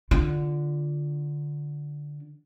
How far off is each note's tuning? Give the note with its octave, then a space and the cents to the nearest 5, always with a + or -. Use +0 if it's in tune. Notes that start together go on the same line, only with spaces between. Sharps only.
D3 +0 F4 +0